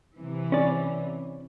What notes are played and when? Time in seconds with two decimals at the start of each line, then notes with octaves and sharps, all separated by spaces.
0.15 C3 E3
0.52 C#4 D5